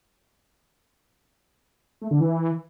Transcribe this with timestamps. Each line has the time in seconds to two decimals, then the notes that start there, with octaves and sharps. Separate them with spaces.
2.02 A3
2.11 D3
2.20 E3